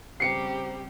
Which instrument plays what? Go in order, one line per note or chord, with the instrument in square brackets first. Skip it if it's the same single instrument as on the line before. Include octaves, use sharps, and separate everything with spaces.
[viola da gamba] C#3 G3 C4 [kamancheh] G4 [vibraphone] C5 A#5 [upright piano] C7 C#7